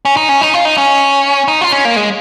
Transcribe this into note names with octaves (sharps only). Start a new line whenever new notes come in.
C#4
D#4
C#4
D#4
F4
D#4
C#4
D#4
F4
C#4
A#3
G#3